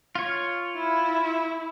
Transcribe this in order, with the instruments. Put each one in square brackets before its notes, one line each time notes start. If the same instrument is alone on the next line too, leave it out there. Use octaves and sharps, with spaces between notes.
[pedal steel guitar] F4 C#5
[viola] E4